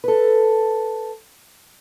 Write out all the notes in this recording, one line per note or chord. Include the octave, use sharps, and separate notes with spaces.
A4 B4